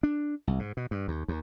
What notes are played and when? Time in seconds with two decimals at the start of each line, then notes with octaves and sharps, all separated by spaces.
0.03 D4
0.47 C2
0.59 G#2
0.77 B2
0.91 G2
1.08 D#2
1.28 D#2